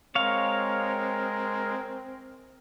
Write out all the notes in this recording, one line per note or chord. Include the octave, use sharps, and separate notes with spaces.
G#3 C4 A#4 C#5 F5